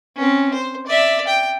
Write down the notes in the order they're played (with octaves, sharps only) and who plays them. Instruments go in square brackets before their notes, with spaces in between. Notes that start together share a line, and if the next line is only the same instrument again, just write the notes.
[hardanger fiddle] C4 C#4
C5
D5 E5
G5